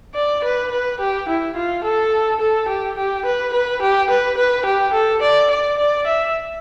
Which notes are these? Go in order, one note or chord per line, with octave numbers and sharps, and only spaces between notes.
D5
B4
B4
G4
E4
F4
A4
A4
G4
G4
B4
B4
G4
B4
B4
G4
A4
D5
D5
D5
E5